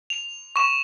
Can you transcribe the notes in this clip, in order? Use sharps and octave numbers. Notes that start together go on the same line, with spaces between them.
F7
C#6 E7